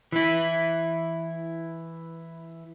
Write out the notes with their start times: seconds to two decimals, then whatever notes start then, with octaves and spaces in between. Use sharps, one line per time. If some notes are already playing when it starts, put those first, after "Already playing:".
0.12 E3 E4